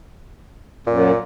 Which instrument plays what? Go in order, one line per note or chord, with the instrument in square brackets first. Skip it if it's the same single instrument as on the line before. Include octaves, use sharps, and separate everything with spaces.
[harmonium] F#2 [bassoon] A#2